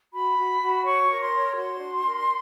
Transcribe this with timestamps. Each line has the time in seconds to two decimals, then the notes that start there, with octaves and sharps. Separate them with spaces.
0.13 F#4 B5
0.37 F#4
0.60 F#4
0.84 C#5 C#6
1.08 A#4
1.20 C6
1.32 C#5
1.56 F#4 C6
1.80 D4
2.04 A#4